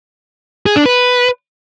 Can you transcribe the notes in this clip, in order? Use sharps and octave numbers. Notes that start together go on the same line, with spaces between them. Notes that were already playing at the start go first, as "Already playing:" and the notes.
G#4
D4
B4